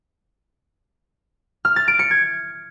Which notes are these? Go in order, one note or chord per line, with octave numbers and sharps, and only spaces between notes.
F6
A6
D7
C#7
G#6